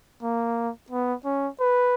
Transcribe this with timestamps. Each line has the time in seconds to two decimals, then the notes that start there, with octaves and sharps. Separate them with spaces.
0.23 A#3
0.90 B3
1.25 C#4
1.60 B4